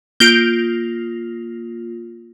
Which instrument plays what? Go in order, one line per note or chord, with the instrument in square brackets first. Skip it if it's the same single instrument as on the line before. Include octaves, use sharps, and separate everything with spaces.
[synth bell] A#3 F4 [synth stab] G6 D7